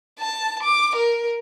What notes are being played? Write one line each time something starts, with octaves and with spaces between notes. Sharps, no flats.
A5
D6
A#4